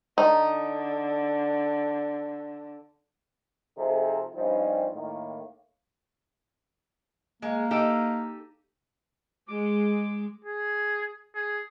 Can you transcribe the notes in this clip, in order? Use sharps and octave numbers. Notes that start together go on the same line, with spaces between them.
D3 D#4
C3 F3 D#4 G#4 A4
G2 F3 G3 C4 C#4 D#4
A2 D#3 A#3
G#3 A#3
D#4 G4 A4
G#3 D6
G#4
G#4